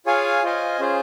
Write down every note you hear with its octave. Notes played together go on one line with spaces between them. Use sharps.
F4 G#4 C#5 F5 G#5
F4 C5 D#5 G#5
C#4 F4 G#4 C5